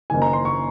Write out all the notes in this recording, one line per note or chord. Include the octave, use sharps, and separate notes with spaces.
F#1 F#2 D#3 G#5
A#5
C6
C#6